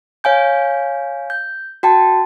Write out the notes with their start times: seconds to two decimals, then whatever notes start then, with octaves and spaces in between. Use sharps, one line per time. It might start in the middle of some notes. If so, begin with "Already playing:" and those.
0.24 C#5 F5 G#5 G6
1.30 G6
1.83 F#4 G5 A5